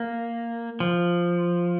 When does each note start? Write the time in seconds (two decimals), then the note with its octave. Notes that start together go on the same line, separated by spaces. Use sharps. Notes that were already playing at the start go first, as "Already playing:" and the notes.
Already playing: A#3
0.80 F3